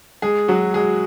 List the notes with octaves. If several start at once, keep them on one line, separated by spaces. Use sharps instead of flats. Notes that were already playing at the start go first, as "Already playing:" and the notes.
G#3 G#4
F#3 F#4
G#3 G#4